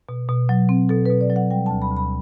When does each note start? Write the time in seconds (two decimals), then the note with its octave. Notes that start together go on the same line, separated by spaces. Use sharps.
0.09 B2
0.29 B2
0.49 F#3
0.69 C4
0.89 B2 A4
1.06 B2 B4
1.21 D5
1.30 F#3
1.36 F#5
1.50 G3 G5
1.66 D2 A5
1.82 B5
1.91 D2
1.96 B5